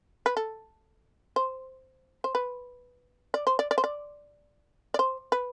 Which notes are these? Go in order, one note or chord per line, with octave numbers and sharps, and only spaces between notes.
B4
A4
C5
C5
B4
D5
C5
D5
D5
C5
D5
D5
C5
B4